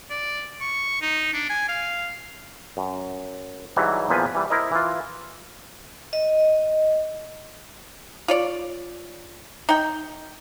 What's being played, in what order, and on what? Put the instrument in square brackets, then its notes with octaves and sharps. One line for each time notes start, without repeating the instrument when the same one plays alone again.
[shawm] D5
C#6
D#4
D4
G#5
F5
[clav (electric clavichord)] F#2
G#2 E3 F#3 G3
E2 A#2 F3 B4 G#5
E3 G3
E4 A#4 C5 D#5
E3 F4
[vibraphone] D#5
[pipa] F4 C#5 D5
D#4 G5